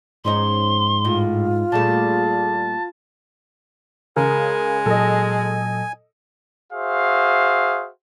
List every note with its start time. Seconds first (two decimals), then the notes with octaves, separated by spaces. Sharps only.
0.25 G#2 F3 C#4 D#4 C6
1.05 A2 F4
1.72 A#2 G3 A3 G#4 A5
4.17 C#3 G#3 A#4 G#5
4.86 A#2 F#3 A4 D#5
6.73 F#4 G#4 C5 E5 F5